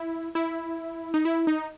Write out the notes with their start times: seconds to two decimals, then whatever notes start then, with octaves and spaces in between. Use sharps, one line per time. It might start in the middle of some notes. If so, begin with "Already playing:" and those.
Already playing: E4
0.35 E4
1.14 D#4
1.25 E4
1.47 D#4